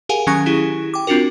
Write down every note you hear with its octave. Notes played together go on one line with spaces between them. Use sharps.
G4 G#4 A#4 F5 F#5 G#5
D#3 F#3 C#4 G#5 C#6 A#6
E4 G4 G#4
G5 D6
C4 D4 F4 F#4 A#4